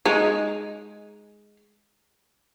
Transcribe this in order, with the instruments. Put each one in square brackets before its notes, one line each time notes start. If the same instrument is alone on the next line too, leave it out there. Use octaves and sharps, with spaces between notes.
[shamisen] G#3 D#4